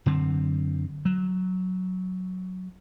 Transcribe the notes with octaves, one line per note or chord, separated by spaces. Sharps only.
F#2 D3 C4
F#3